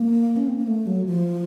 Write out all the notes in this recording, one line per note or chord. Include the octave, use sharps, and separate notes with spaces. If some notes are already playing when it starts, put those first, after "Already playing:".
Already playing: A#3
C#4
C4
A#3
A3
F#3
F3